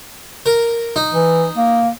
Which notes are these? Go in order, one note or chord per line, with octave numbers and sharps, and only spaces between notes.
A#4
D#4
E3
A#3